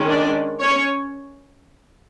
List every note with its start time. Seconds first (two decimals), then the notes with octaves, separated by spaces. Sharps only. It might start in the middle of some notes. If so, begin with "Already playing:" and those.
Already playing: D#3 G#3 C#4
0.09 D4 D5
0.62 C#4 C#5